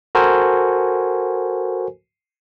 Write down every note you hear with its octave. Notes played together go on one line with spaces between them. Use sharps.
F#4 A4 A#4 C5 G#5